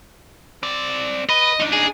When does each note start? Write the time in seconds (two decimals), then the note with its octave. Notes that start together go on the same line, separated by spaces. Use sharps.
0.63 C4 D5
1.29 B4 D#5
1.60 D4 D#4
1.73 G#4